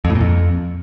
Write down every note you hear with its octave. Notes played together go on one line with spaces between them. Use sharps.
F2
A2
A#2
F2